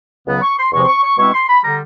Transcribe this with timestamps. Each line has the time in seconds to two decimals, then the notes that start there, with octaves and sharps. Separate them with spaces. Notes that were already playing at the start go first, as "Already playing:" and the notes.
0.27 C#2 C#3 F#3 B3
0.42 C#6
0.58 C6
0.72 E2 C3 F3 G#3 C4 C#6
0.83 C6
0.88 C#6
1.03 C#6
1.18 B2 G#3 C4 E4 C#6
1.33 C6
1.48 B5
1.63 D3 G3 A#5